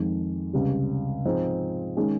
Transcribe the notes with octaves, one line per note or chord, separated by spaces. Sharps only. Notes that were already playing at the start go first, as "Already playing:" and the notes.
Already playing: F2 D#3 G#3
C#2 C3 G3
G#2 F3 C4 D#4 G#4
D#3 G#3 C#4 G#4